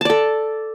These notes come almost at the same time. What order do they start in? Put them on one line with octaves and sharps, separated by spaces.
A5 D5 A4